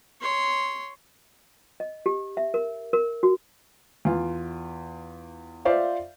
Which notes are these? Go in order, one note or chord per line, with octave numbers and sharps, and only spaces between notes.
C#5 C6
D#5
G4
E5
A#4
A#4
F#4
E2 F4
F4 C5 D5 E5 F5